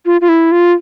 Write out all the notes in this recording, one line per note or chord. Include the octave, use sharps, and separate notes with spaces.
F4
F4
E4
F4